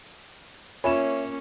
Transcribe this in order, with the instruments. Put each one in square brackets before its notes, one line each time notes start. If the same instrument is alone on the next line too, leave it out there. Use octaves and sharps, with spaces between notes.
[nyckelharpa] A#3 C#4 [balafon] F4 G#5 B5 [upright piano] C#5 E5 E7